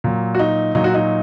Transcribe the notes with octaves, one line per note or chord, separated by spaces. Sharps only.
A#2 F#3
F#4
D#4
A#2 F#3 D#4
F#4
D#4